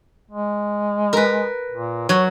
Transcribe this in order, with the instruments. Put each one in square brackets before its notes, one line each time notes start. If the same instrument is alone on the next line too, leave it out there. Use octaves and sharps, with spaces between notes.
[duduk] G#3
[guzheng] A#4 B4
[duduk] A#2
[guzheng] F#3 [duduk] C#5